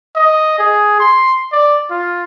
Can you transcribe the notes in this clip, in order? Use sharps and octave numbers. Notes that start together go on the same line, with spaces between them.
D#5
G#4
C6
D5
F4